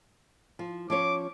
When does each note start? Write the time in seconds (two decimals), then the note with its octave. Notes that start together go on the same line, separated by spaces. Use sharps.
0.59 F3
0.90 F3 C#4 C#5 D6